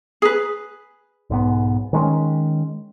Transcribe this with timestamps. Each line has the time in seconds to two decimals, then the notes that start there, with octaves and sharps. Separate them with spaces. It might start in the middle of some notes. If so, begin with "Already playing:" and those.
0.22 G#4 B4
1.30 B1 G#2 B3
1.93 D#3 G#3 C#4